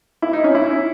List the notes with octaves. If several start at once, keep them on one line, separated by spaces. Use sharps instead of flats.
E4
D#4
C#4
E4